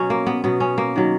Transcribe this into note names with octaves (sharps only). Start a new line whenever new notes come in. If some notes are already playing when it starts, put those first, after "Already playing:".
Already playing: B2 F#3 C#4
A#3
B3
B2 F#3 B3
C#4
A#3
D#3 F#3